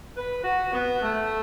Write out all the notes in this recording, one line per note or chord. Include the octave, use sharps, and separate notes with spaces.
B4
F#4
B3
A3